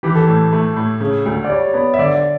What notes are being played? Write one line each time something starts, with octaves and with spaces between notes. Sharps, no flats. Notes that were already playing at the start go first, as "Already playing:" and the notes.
E3 G4
A4
A2
A3
A2
C#3
D2
D5
G3 C#5
B3 C#5
E5
D3 D5
D5